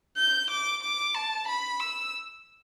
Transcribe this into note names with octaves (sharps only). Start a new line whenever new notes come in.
G6
D6
D6
A5
B5
E6